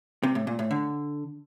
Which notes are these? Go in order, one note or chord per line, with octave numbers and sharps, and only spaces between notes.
C3
A2
A#2
A2
D3